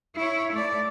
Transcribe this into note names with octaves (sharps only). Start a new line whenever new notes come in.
E4 C#5
A3 D5